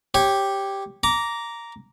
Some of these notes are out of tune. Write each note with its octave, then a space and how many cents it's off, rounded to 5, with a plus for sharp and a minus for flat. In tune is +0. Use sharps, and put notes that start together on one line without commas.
G4 +0 C#5 -20
A#5 +0 D6 -20